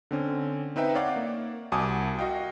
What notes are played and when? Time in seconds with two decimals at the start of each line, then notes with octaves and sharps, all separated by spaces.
0.11 D3 C4 C#4
0.76 C4 D#4 B4 E5 G5
0.95 C#5 D5 F5 F#5 D6
1.16 A#3
1.72 C2 F#4 G#5 A5 D6 D#6
2.19 F#4 D#5 F5 G5